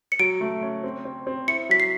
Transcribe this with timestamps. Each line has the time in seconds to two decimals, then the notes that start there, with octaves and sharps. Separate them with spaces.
0.12 C#7
0.19 F#3 D7
0.41 A3
0.63 C#4
0.84 C4
1.05 C4
1.27 C4
1.48 E4 C#7
1.69 F#3 B6
1.80 C7